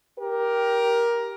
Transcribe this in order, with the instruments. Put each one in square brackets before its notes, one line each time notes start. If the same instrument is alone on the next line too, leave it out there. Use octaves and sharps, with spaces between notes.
[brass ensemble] G4 A#4